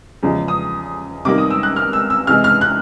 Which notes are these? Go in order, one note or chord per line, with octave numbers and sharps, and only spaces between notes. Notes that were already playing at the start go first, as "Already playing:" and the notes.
E2 C#3 F3 G#3
D#6
C3 D#3 G3 A#3 D6
D#6
E6
F#6
F6
E6
E6
C3 E3 G#3 F6
F6
F#6